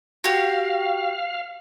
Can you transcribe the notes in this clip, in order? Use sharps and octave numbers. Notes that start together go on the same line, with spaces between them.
F#4 G4 F5